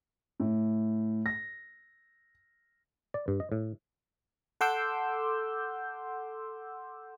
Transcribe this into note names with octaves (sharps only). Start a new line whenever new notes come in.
A2
A#6
D5
G2
D#5
A2
A4 F#5 C6 D6 E6 G6